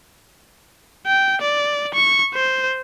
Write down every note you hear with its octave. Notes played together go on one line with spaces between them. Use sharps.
G5
D5
C#6
C5